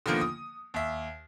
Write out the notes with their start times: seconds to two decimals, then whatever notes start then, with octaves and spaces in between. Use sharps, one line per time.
0.06 D3 D#3 F3 A#3 B3
0.21 D#6
0.74 D#2 E5